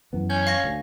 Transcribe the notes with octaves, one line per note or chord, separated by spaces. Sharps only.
F#2 E3 B3
C#4 G6
F5 C#6 A#6
D2